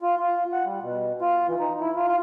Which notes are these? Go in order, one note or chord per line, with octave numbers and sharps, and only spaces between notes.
F4
F4
F#5
G3
B2
F4
E3
D#4
E4
F4
F4